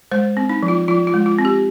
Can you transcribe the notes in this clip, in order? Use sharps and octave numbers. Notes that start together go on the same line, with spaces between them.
G#3 C5
C4
D#4
F3
F4
F3 F4
F4
G#3
F4
C4
G4